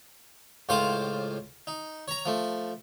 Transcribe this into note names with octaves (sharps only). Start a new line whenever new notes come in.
C#2 A2 F4 C5 F5 D6
D#4
C#5 A#5
F3 A3